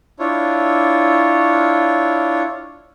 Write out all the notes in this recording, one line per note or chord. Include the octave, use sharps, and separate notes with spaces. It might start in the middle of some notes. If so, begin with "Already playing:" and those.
D4 E4 F4 C#5